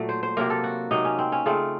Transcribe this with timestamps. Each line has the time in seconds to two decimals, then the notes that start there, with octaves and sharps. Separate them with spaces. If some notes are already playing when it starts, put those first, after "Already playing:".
Already playing: A#2 F#3 A3
0.09 C5
0.23 C5
0.37 C3 F#3 A#3 A#4
0.50 A4
0.64 F#4
0.91 C3 F#3 A#3 D#4
1.05 C#4
1.19 C4
1.32 C#4
1.46 C#3 A3 C4 F4